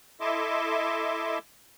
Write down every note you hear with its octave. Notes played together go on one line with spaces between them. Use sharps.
E4 A4 D#5 E5 C6 D6